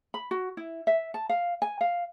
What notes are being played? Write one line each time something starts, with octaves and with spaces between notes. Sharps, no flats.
B5
F#4
E4
E5
A5
F5
G#5
F5